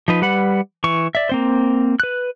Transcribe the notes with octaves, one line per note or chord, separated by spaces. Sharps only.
F3 D#4 B4
G3 B4 F#5 B5
E3 C#6
D5 E5
A#3 C4 C5
B4 F#6